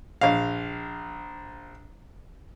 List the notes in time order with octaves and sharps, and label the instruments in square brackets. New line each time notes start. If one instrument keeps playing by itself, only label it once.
[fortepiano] A#1 F5